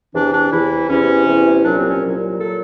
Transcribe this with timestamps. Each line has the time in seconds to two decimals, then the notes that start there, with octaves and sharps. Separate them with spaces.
0.13 E2 C3 E3 D4
0.33 D4
0.51 E2 C3 E3 E4
0.88 E2 C3 E3 C#4
1.26 E2 C3 E3
1.64 C2 A#2 F#3 D4
1.76 C4
1.89 C#4
2.01 C2 A#2 F#3
2.39 A#2 F#3 A4